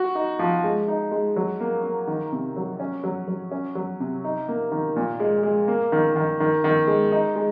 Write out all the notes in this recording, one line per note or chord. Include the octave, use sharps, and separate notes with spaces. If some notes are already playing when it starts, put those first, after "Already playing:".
Already playing: F#4
D#4
F3
G#3
D#4
G#3
F#3
A#3
A#3
D#3
C3
F#3
C#4
F#3
F#3
C#4
F#3
C3
D#4
A#3
D#3
A#2
G#3
G#3
A#3
D#3
D#3
D#3
D#3
G#3
D#4
G#3